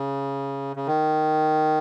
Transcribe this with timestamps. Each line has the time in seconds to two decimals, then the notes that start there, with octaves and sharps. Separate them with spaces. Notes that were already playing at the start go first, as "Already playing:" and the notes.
Already playing: C#3
0.76 C#3
0.87 D#3